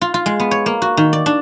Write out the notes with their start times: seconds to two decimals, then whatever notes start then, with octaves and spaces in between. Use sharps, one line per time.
0.02 F4
0.14 F4
0.26 G#3
0.40 B3
0.51 C#5
0.66 A#3
0.82 F#4
0.97 D#3
1.13 D5
1.26 D4